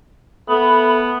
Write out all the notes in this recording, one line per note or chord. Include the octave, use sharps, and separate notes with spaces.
A3 B3 B5